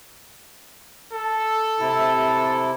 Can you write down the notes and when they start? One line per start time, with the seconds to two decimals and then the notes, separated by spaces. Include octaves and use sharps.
1.12 A4
1.79 C3 E4